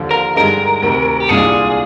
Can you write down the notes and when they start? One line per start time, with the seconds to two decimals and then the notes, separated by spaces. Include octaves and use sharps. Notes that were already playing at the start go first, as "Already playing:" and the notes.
Already playing: D#2 D3 F3
0.11 A#4
0.36 G2 D3 G#3 D#4 G4 A#4
0.82 D2 C3 D#3
1.20 G4
1.29 C2 A#2 G#3 D4 F4 G#4